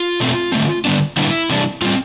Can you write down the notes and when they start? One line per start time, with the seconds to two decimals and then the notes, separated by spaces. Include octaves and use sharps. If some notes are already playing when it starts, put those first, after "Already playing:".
Already playing: F4
0.20 B2 A3 C4
0.52 D3 A3 C4
0.85 D3 G3 B3 D4
1.17 D3 G3 B3 D4 E4
1.50 C3 E3 G3 D4
1.82 A2 G3 C4 F4